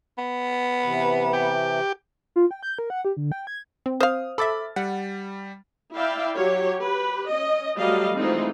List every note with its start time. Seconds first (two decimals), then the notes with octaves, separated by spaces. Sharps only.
0.18 B3
0.84 C3 E3
1.33 G4
2.36 F4
2.51 G5
2.63 G6
2.79 A#4
2.90 F#5
3.05 G4
3.17 D3
3.32 G5
3.47 G#6
3.86 C4
4.00 C5 F5 D#6 F6
4.38 A4 E5 B5 D6 A6
4.76 G3 F#5
5.95 E4 D5 E5 F5 G5
6.37 F#3 G4 C#5
6.84 G4 B4
7.28 C#4 D#5
7.77 F#3 G3 A3 D#5 F5
8.14 E3 G#3 A3 C4 D#4 F4